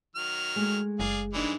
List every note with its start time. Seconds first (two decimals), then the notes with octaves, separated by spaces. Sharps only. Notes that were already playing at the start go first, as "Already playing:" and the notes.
0.16 D#3 F#3 F6
0.56 G#3 A3
1.00 F#1 G#4 D5 F5
1.34 F#2 E3 G3 G#3 D4 D#4